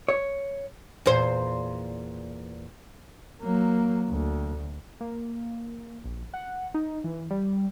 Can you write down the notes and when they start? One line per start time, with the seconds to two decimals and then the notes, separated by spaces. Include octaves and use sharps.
0.08 C#5
1.06 E2 A#2 C5
3.41 F#3 A#3
4.10 D2
5.00 A#3
6.04 A#1
6.34 F#5
6.74 D#4
7.04 E3
7.30 G3